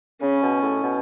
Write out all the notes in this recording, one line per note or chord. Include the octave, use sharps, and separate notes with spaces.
C#3 C#4
B2
A2
B2